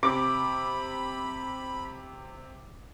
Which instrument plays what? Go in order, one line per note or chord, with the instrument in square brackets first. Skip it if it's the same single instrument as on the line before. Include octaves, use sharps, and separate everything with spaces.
[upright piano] C3 [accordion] B5 [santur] D6